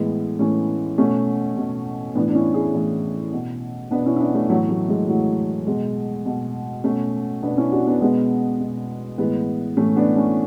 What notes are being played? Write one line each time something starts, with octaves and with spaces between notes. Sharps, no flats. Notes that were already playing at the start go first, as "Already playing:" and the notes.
Already playing: A2 E3 G#3 B3
A2 E3 A3 C#4
B2 A3 C#4
B2
A2 E3 B3 D4
D4
C#4 E4
E4 G#4
A2 E3
B2
B2 B3 D4
C#4 E4
E4
B3 D4
A3 C#4
A2 E3 F#3 A3
F#3 A3
G#3
A2 E3 F#3
B2 G#3
B2
B2 A3 C#4
B2 B3 D4
C#4 E4
D4 F#4
B3 D4
B2 G#3 B3
B2
A2 E3 G#3 B3
A2 E3 A3 C#4
B3 D4
A3 C#4